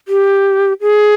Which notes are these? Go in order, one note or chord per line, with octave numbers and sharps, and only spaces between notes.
G4
G#4